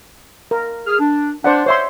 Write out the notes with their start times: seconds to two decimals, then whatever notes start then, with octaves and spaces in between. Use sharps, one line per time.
0.51 A#4
0.86 G#4 F6
0.99 D4
1.44 D4 C5 D5 F#5
1.66 C5 C#5 E5 C6